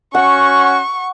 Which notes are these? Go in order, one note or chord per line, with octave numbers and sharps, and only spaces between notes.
C#4 F#4 F#5 C#6